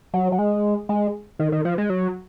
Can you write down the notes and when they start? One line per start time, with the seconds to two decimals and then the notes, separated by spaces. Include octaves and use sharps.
0.14 F#3
0.32 F#3
0.39 G#3
0.89 G#3
1.39 D#3
1.52 D#3
1.65 F3
1.78 G#3
1.90 F#3